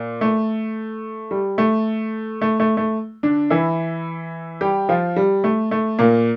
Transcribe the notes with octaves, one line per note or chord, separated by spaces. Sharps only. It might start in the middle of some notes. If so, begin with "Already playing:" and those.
Already playing: A#2
A3
G3
A3
A3
A3
A3
D3 D4
E3 E4
G3 G4
F3 F4
G3
A3
A3
A#2 A#3